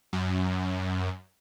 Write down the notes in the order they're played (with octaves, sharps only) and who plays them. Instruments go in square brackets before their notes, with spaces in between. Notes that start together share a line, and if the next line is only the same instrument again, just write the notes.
[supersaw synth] F#2